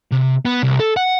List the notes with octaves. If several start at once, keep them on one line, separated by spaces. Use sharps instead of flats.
C3
B3
C2
A4
F#5